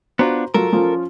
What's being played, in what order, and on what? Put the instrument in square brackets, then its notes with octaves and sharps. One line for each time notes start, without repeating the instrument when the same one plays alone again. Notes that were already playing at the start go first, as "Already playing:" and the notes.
[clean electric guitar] B3 D4 F4 [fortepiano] F#4 C5 A#5
[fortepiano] F#3 F4 [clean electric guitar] A4 A#4
[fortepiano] F3 C#4 F4